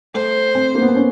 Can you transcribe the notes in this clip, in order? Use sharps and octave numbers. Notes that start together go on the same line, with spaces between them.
A3 C5
C4
A#3
B3
C4
C#4